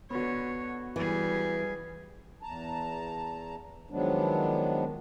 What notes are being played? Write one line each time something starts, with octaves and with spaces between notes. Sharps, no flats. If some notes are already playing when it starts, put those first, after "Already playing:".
D3 B3 F#4 C#5
E3 G3 G#4
E2 A5 A#5
D#3 F3 F#3 G#3 B3 D4